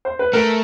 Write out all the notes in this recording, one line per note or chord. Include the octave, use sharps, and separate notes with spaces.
C5
B4
A3 A#4